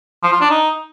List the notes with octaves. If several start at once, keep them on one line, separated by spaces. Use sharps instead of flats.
F3
F4
D4
D#4